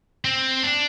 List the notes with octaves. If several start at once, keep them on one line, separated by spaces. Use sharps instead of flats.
C4
D4